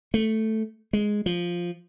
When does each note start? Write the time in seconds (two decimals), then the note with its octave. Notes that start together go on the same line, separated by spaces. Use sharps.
0.14 A3
0.93 G#3
1.26 F3